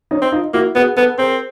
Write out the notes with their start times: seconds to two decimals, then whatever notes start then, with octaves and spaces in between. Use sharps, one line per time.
0.11 C#4 D#4
0.22 C4
0.32 D#4 F4
0.54 A#3 E4 F#4
0.75 B3 F#4 G#4
0.96 B3 A4 B4
1.18 C4 G#4 A#4